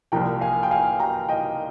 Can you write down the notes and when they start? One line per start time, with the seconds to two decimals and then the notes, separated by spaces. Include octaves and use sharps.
0.12 C2 A#2 F3 G5 A#5
0.41 F5 G#5
0.63 G5
0.71 F5 G#5
1.00 G5 A#5
1.29 D#5 G5